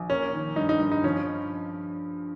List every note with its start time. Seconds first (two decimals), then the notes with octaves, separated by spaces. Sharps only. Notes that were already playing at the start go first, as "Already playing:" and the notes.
Already playing: A#1
0.10 A#3 C#4
0.33 D#3
0.56 G2 D#4
0.69 D#4
0.80 G2
0.92 D#4
1.04 F3 C#4